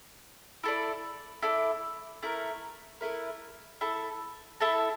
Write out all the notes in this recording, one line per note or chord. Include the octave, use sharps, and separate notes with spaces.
E4 A4 D5
E4 A4 D5
A3 E4 A#4
A3 E4 A#4
E4 A4 E5 A5
E4 A4 E5 A5